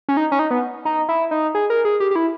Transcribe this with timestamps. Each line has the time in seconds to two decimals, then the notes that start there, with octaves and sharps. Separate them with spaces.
0.09 C#4
0.17 D#4
0.32 C#4
0.39 D#4
0.51 B3
0.85 D#4
1.09 E4
1.31 D#4
1.55 G#4
1.70 A#4
1.85 G#4
2.00 G4
2.11 G4
2.16 E4